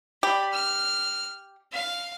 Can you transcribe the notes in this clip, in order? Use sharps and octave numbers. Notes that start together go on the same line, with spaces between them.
G4 D5 B5
F6
F5